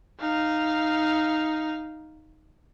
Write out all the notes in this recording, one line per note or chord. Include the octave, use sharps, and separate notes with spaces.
D#4 F5